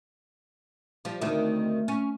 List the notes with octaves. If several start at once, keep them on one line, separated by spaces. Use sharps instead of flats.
F3 G3
D2 D#3 C4
C#4